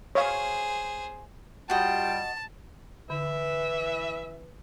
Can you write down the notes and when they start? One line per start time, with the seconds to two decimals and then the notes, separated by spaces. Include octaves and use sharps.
0.15 G#4 C5 C#5 F5
1.70 G3 F4 F#4 D#5 G5 A5
3.10 D3 E3 B4 E5